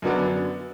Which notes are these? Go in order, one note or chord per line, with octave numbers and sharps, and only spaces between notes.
F#2 D3 F#3 B3 D4